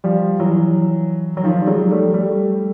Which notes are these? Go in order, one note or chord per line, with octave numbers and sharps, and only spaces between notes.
F3 G3
E3 F#3
F#3
D#3 F3
G3
F#3 G#3
G3 A3
G3 A3